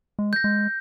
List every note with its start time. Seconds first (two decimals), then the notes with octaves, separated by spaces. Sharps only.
0.19 G#3
0.33 G6 A#6
0.44 G#3